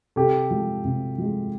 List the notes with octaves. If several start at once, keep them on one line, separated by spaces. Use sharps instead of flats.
C3 G4 A4
F3 G#3
C3
F3 G#3